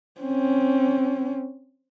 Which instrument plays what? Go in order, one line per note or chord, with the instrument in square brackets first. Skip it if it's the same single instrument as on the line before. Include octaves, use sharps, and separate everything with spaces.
[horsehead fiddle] C4 C#4